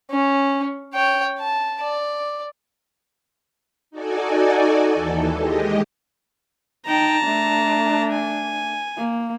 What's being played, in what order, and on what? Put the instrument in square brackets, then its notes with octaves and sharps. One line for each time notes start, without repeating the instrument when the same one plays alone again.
[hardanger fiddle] C#4
C#5 G5
A5
D5
[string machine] D#4 F#4 A4 D5 G#5
D#2 E3 A4
G#3 G4 D#5
[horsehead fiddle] D#4 G5 [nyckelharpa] A5 A#5
[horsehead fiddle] A3 D4
[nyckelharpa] G#5
[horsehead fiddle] A#3